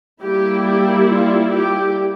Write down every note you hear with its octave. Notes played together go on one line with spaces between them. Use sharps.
G3 A#3 E4 G4
G4
F4
G4